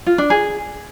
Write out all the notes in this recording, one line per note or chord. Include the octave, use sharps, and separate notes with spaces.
F4
D4
G#4